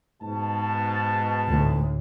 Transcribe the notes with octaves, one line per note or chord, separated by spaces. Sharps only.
G#2 B2 A5
D2 A2